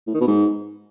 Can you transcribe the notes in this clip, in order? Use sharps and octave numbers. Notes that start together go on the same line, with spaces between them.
A2
D#3
B2
G#2